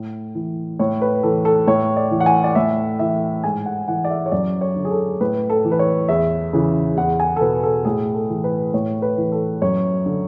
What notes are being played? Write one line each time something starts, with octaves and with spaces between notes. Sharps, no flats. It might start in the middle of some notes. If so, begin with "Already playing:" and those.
Already playing: A2
E3
A2 C#5
B4
E3 A4
A4
A2 C#5
D5
E3
F#5
G#5
D5
A2 E5
E3 E5
G#2 G#5
F#5
E3 F#5
D5
E5
C#5
F#2 D5
C#5
D3
G#4
A4
A2 B4
A4
E3
B4
C#5
E2 E5
C#3 E3
E2 F#5
G#5
A4
B2 B4
A4
A2 G#4
A4
E3
B4
A2 C#5
B4
E3
A4
F#2 C#5
D3